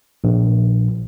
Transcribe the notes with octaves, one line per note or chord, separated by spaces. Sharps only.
A#1